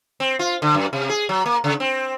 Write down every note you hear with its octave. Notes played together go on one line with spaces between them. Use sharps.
C4
F4
D3
F#2
C3
G#4
F#3
A#3
C#3
C4